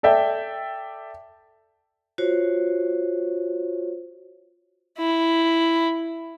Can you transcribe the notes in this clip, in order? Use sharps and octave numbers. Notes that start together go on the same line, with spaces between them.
A4 D5 E5 G5
F4 F#4 C5 C#5
E4